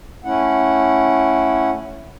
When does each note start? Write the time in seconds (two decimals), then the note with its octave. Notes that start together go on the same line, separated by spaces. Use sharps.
0.25 A3 C#4 E4 F#5